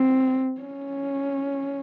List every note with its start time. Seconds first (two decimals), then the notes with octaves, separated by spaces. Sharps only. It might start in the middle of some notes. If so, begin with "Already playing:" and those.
Already playing: C4
0.61 C#4